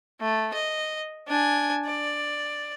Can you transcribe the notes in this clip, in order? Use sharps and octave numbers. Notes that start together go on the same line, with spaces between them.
A3
D#5
D4 G#5
D5